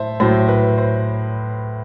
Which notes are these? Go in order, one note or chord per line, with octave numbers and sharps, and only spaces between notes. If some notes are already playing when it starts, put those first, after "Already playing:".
Already playing: A2 C5 E5 A5
A2 F#3 C5
B4
C5